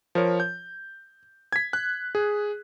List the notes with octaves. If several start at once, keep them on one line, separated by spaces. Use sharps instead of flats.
F3 A#4 C#5
G6
G#6 B6
F#6
G#4